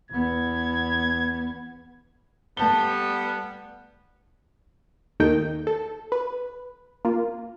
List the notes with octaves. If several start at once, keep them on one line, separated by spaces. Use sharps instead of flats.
E2 B3 G#6
G3 A3 B3 A5 G7
D#2 A3 A#3 D#4 G5
A4
B4
A#3 F4